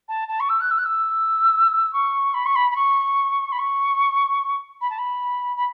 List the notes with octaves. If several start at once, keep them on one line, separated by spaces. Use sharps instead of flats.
A5
A5
C#6
E6
F#6
E6
F#6
E6
C#6
B5
C#6
B5
B5
C#6
B5
C#6
B5
A5
B5
B5